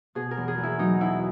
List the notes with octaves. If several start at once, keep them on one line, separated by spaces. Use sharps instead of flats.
B2 G#4
A#4
E2
G#4
E2
E4
F#3 D#4
B2 E4